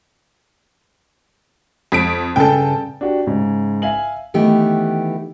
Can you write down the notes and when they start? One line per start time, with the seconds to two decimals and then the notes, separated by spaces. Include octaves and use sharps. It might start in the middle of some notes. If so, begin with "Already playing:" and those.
1.92 F2 B6 D7
2.36 G2 C#3 A4 G5
3.01 D4 F#4 G4
3.26 G#2 C#3
3.82 E5 F5 G#5 F#7
4.34 D#3 E3 A3 B3 G4